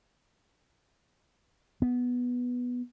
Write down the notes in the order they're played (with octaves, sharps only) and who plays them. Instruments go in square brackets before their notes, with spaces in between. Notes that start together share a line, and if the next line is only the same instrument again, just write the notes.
[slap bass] B3